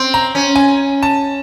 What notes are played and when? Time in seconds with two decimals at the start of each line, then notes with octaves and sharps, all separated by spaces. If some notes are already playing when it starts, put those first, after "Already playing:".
Already playing: C4 C6
0.14 A#5
0.35 C#4
0.56 G#5
1.03 A5